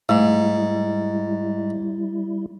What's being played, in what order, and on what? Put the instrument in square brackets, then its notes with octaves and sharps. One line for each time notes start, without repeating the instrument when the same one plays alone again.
[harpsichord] G#2 [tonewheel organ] G3 E4 [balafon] A3